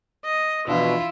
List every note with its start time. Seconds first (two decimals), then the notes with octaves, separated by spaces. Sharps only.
0.25 D#5
0.68 B2 E3 F3 D4 E4 F4